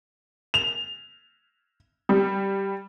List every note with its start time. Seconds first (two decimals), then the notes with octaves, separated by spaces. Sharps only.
0.54 F7
2.09 G3